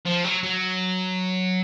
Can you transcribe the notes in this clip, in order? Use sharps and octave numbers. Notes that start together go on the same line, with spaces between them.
F3
F#3
F#3